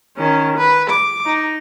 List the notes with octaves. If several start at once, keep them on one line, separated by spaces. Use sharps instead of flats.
D#3 C#4
B4
D6
D#4